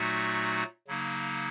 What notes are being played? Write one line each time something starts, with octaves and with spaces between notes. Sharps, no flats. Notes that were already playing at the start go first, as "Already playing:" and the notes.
Already playing: A#2 F#3 A3 D#4 F#4
C#3 F#3 A#3 D#4